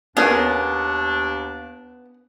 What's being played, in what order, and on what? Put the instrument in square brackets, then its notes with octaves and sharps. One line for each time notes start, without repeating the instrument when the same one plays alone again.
[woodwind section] D#2 D4 [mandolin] B3 [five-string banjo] C#4 G#4 A#4